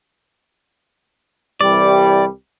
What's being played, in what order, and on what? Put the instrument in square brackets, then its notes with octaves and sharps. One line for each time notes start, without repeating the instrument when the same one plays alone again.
[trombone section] C2 E3 G3 [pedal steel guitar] D5